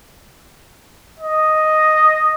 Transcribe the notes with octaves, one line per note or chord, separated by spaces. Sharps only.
D#5